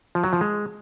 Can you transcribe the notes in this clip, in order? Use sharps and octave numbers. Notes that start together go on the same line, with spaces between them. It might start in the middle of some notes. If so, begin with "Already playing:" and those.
F3
F#3
F3
G#3